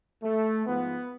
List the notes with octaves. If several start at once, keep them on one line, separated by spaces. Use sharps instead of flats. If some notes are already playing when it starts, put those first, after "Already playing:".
A3
G#2 F3 B3